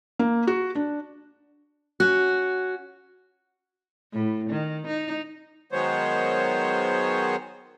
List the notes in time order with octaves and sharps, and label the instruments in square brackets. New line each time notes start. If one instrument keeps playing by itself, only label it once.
[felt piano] A#3
F#4
D4
[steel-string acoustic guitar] C#4 F#4 [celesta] F#6
[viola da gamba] A2
D#3
D#4
[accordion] D#3 F#3 G#3 B3 C5 C#5